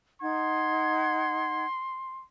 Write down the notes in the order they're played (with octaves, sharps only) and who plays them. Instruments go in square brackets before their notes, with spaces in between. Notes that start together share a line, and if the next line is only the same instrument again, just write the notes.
[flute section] D#4 F#5 G#6 [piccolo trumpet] C6